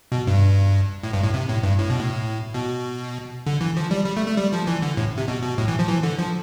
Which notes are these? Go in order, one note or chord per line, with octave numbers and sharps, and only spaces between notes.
B2
G2
A2
G2
A2
C3
A2
G2
A2
B2
A2
B2
D3
E3
F3
G3
G3
A3
A3
G3
F3
E3
D3
A2
C3
B2
B2
A2
E3
F3
E3
D3
F3